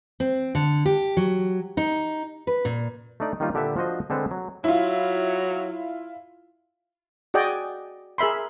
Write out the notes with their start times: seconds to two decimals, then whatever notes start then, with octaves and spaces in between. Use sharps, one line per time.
0.20 C4
0.55 D3
0.86 G4
1.17 F#3
1.77 D#4
2.47 B4
2.65 A#2
3.20 A3 D4 D#4 D5
3.40 D#3 G3 A#3 D#4 F4
3.54 A#2 D3 G4 A4 B4 E5
3.76 F3 D4 F#4 C5 D#5
4.10 D3 G#3 C4 A4 B4
4.31 F#3
4.64 F#3 E4 F4
7.34 F#4 G#4 D5 D#5 G5 G#5
8.18 G#4 A#4 E5 B5 C6